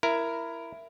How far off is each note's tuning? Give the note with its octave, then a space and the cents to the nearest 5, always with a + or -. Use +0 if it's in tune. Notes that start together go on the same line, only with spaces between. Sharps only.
E4 +15 A#4 +0